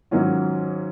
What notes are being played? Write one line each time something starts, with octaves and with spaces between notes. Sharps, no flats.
G#2 D#3 F#3 C#4 F4